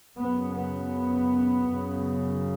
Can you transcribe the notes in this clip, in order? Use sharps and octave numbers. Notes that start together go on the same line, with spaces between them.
F#2 C#3 B3
B3
F#2
C#3